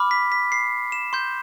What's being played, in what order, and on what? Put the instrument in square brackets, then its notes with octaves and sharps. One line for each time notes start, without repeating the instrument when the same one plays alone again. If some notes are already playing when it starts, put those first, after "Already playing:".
Already playing: [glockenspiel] B5 D6 F6
B6
B6
C7
E7
C6 G6